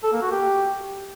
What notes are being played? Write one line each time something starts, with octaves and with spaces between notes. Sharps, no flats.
A4
A#3
F#4
G4